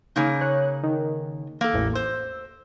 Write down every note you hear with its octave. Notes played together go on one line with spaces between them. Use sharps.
C#3 A#3 D#4
C#5 F#6
D#3
A#3 A4
A1 E2
C5 E6